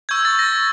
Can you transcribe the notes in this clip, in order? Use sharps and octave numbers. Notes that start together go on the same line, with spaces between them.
C#6 E6 G6 G#6
A6
A#6